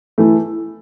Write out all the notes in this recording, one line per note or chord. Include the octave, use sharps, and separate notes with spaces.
E3 A3 E4